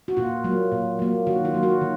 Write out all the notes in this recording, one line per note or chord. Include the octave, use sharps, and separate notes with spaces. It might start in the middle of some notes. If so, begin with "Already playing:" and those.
F#4
A#2 F4
F#3 A#3
A#2
F#3 A#3
D#3 F#4
F4
F#3 A#3
F#4
D#3